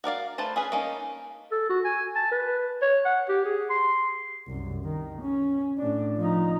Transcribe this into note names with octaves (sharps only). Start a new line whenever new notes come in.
F#4 A#4 D5 F5
A3 B4 C5 A5
C#4 G#4 B4
A#3 C#4 D#4
A4
F#4
G#5
A5
B4
C#5
F#5
G4
G#4
C6
C2 F#2
D#3
C#4
A2 D4
F3 D#4